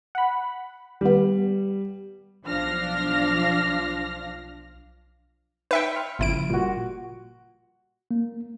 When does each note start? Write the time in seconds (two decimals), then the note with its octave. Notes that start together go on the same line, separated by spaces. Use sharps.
0.15 F#5 B5
1.01 D#2 G3 B3
2.47 B1 F3 D4 F5 F6 A#6
5.71 D#4 B4 E5 G5 B5 C#7
5.96 C6 F6
6.19 G1 A#2 C#3 F3 E4 D7
6.49 A#2 G3 F#4
8.11 A#3